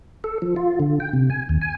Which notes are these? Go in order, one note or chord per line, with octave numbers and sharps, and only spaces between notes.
A4
F3
F4
D3
G5
C3
G#5
D#2
G#5